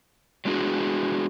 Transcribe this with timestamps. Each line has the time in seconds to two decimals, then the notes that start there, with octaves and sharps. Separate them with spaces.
0.45 F#3 G#3 D4 F#4 G#4